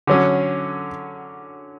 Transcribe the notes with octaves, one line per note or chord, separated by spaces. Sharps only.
D3 F#3 C#4